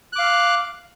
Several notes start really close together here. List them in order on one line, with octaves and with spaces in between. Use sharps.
F#6 D6 F5